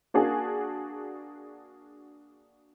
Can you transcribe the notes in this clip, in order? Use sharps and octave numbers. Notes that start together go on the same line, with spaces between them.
A#3 D4 F#4 G#4